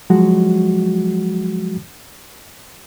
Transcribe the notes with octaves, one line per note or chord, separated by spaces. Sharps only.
F3 F#3 G#3 F#4